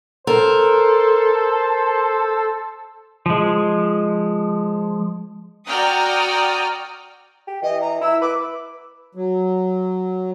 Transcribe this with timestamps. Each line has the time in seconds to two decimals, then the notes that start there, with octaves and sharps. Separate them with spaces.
0.27 A4 A#4 C5
3.26 F3 G#3
5.67 F#4 D5 G5 A#5 D#6 F6
7.48 G4
7.63 E3 D#5
7.81 A#5
8.02 E4 E6
8.22 B4 D6
9.15 F#3